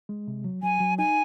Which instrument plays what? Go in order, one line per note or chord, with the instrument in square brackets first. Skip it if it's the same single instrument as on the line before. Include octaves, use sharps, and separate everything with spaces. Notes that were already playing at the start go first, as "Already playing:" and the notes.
[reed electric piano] G#3
C3
F#3
[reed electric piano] F#3 [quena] G#5
[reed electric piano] F#3
[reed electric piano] D#4 [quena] G#5